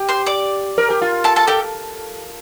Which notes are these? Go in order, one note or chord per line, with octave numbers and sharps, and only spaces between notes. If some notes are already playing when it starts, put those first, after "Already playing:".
Already playing: G4
C5 C6
D5 D6
A#4
G4
F4
A4 A5
A4 A5
G4 A4 G5